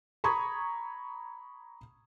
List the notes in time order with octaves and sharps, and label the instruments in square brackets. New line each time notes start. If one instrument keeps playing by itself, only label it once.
[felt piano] A#5 B5 C#6 D#6 G#6